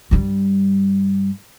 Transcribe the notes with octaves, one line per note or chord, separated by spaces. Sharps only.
G2 G3